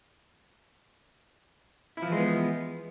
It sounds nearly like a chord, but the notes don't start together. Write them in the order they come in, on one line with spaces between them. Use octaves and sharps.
E4 F3 E3 G#3 B3